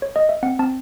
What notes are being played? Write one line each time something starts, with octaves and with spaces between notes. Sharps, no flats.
C#5
D#5
E5
C4 F#5
C4 A5